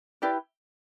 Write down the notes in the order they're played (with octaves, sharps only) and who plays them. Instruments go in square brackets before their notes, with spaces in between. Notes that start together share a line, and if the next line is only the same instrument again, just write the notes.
[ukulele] E4 G4 B4 D5